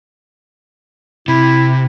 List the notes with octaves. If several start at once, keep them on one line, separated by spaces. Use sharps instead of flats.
C3 E4